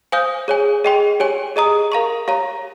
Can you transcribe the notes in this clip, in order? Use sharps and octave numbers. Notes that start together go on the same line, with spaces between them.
C5 F5 G#5 D#6 G6
G#4 C#5 G#5
G#4 D#5 G5 C6
G4 C#5 G#5
G#4 D#5 A#5 D#6
A#4 F5 A#5 C#6
G4 C#5 F5 A#5